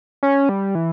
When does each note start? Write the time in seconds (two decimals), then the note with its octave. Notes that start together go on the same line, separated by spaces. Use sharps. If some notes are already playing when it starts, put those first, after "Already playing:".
0.23 C#4
0.49 G3
0.75 E3